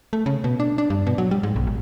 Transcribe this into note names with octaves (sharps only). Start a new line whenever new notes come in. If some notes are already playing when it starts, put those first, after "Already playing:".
A3
C#3
B2
D4
D4
G2
B2
F#3
G3
G#2
B1
G#1